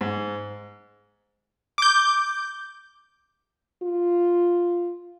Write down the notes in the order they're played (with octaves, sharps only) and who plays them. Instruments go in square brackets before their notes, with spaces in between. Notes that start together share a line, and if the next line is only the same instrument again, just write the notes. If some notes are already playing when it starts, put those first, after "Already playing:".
[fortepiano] G#2
[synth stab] D6 G6
[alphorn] F4